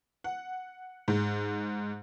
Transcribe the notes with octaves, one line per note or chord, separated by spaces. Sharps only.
F#5
G#2